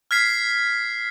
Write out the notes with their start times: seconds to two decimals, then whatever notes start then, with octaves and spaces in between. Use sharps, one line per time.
0.11 F6 G#6 B6 C7